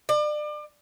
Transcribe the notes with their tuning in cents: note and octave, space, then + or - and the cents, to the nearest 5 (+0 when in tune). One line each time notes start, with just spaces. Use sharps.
D5 +35